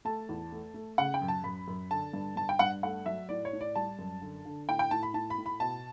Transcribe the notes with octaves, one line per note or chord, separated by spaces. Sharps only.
A3 A5
E2
A3
A3
C#3 F#5
G5
F#2
A5
F#2 B5
F#2
D3 A5
G2
G2 A5
G5
G2 F#5
A3 F#5
F#3 E5
A2 D5
C#5
A2
D5
G3 A5
F#2
D3
D3
A2 G5
G5
A2 A5
B5
A2 A5
B5
A2
B5
B2 A5